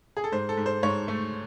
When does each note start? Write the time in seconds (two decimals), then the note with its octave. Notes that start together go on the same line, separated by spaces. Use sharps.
0.17 G#4
0.24 A4
0.32 G#2 C5
0.49 A4
0.57 G#2
0.66 C5
0.83 G#2 C#5
1.08 A3